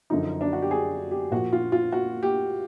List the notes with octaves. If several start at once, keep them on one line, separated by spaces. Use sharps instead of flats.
F#2 D3 F3 D#4
D4
F#4
G4
G#4
G4
A#2 F3 F#4
F4
F4
F#4
G4